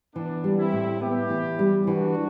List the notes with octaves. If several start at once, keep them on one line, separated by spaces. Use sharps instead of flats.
E3 B3 D4
G3
C4 E4
A2
B3 E4 G4
E3
G3
E3 D4 F#4